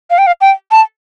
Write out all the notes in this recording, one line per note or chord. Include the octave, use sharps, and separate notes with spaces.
F5
G5
F5
G5
A5